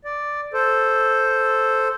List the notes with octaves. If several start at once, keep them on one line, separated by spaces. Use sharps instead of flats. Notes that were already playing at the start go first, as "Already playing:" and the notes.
D5
A4 C5